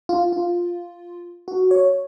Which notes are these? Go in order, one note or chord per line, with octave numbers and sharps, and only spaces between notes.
F4
F4
F#4
C#5